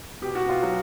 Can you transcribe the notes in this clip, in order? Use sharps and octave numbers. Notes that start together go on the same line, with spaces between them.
B2 G4
F#4
B2 F4
F#3 F#4